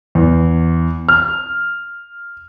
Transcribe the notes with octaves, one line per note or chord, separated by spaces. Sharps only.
E2
F6